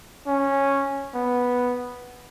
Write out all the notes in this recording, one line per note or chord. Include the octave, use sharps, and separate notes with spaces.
C#4
B3